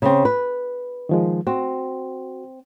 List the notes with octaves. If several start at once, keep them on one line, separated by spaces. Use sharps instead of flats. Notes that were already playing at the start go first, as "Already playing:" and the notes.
C#3 C4
B4
D#3 F3 G#3
C4 F#4